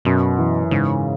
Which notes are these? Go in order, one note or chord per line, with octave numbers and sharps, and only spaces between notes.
F#2 B2
E3
G#2 C#3